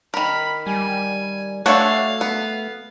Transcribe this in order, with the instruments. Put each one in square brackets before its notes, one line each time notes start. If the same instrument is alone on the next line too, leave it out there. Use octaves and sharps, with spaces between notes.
[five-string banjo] D#3 A#4 [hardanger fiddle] B5
[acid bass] G3 [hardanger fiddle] G#5
[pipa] B2 E5 C#6 [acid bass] A3 [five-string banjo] D4 F#4 C#5 [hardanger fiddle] F5
[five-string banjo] B3